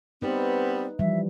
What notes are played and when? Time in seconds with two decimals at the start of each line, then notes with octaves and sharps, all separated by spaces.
0.22 G3 B3 C4 D#4 B4
0.99 E3 F3 G3 E5